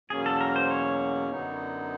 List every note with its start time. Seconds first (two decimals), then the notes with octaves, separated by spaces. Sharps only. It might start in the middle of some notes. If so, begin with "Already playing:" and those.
0.10 E2 B2 F#3 A#3 C#4 G#4
0.26 A4
0.41 A#4
0.56 C5
0.71 C#5
1.31 F#2 D3 F#3 B3 D#4